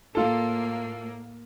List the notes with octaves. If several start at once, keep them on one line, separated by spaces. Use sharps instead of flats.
A2 A#3 F4 A4